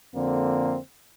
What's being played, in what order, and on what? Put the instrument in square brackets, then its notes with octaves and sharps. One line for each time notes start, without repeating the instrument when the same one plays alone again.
[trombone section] F2 D3 A#3 C4